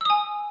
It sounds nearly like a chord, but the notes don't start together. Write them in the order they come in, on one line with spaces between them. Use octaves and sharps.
E6 D#6 G#5